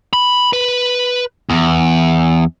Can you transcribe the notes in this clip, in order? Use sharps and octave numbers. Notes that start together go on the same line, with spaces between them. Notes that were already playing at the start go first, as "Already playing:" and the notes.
B5
B4
E2